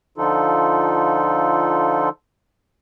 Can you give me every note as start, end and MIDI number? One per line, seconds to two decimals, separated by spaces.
0.18 2.09 50
0.18 2.09 53
0.18 2.09 63
0.18 2.09 65
0.18 2.09 69